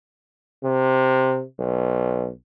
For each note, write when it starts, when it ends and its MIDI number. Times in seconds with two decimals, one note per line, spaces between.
0.64 1.43 48
1.59 2.30 35